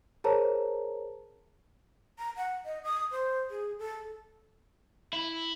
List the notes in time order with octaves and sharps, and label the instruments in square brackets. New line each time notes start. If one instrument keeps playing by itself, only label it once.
[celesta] G#4 A#4 C5 C#5 A5 A#5
[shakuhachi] A#5
F#5
D#5
D#6
C5
G#4
A4
[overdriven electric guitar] E4